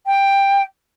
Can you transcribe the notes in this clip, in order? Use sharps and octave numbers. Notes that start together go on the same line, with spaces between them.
G5